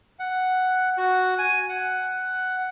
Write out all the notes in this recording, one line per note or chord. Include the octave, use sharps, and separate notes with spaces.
F#5
F#4
G#5
F#5